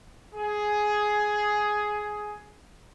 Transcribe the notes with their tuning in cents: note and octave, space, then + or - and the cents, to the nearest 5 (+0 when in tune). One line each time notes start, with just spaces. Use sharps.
G#4 +10